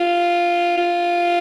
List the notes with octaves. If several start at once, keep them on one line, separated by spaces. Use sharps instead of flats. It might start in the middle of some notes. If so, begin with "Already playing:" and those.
Already playing: F4
F4